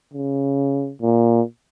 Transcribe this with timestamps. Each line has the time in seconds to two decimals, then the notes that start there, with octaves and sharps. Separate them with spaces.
0.13 C#3
1.02 A#2